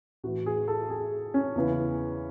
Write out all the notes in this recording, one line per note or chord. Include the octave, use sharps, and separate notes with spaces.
A2 E3 F#4
G#4
A4
G#4
C#4
E2 C#3 E3